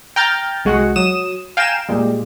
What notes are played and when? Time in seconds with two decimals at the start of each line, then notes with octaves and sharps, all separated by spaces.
0.16 G5 A#5 F6 G6 A6
0.65 C2 G#3 F#4 F#5
0.96 F#3 D#6 E7
1.57 F5 G5 G#5 A#5 E7
1.89 A#2 G3 G#3